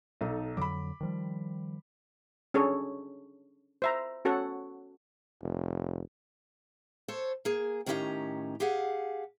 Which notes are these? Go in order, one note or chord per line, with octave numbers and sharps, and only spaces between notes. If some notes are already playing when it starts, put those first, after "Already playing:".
B1 D#4 A4
F2 D3 F#3 B5 D6
D#3 F3 G3
C#4 D4 G#4 A4 C#5
C5 E5 A#5
C#4 F#4 A4 C#5 F#5
F1
A4 C5 C#5
A#3 G#4
A2 D#3 C#4 G4 E5 A#5
G4 G#4 F5 F#5